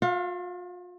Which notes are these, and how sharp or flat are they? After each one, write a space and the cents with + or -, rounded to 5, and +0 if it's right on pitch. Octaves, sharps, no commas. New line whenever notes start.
F4 +40 F5 -25